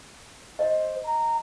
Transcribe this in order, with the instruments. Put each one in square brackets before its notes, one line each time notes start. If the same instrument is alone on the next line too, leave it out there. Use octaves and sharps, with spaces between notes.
[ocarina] C5 [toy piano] D#5
[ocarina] A#5